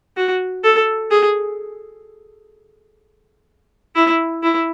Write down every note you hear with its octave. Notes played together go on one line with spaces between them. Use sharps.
F#4
A4
G#4
E4
E4